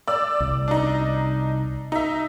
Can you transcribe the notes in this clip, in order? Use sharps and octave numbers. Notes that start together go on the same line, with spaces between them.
D5 E6
C2
D4 D#4
D#4 E5